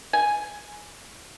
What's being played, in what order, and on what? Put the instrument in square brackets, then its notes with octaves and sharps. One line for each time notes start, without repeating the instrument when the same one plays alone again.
[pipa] G#5